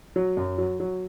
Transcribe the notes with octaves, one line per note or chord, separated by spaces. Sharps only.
F#3
F#2
F#3
F#3